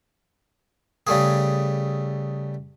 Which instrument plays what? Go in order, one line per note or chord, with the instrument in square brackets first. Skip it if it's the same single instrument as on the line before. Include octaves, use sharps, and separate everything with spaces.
[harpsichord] C#3 G3 A3 G#4